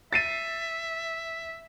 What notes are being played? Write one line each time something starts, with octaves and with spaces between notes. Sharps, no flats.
E5 A6 C7 D#7